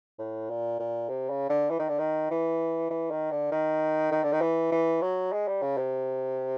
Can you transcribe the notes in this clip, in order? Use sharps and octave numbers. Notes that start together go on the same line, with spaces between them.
A2
A#2
A#2
C3
C#3
D3
E3
D#3
D3
D#3
E3
E3
D#3
D3
D#3
D#3
D3
D#3
E3
E3
F#3
G#3
G3
C#3
C3